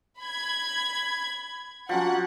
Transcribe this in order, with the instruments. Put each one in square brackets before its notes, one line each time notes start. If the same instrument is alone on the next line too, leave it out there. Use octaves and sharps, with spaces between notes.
[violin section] B5 G#6
[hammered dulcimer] F3 F#3 C#4 [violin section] F#5